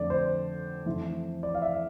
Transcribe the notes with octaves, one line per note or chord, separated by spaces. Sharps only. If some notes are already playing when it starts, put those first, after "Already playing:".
Already playing: F2 D3 A3 D5
C5
F2 E3 A3 E4
D5
F5
E5